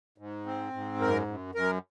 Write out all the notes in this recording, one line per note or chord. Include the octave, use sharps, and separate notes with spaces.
G#2
C4
G#2
F#2 A#4
F#2
F#2 A#4